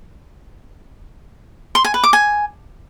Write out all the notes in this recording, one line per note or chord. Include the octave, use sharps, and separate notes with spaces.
C6
G#5
B4
D6
G#5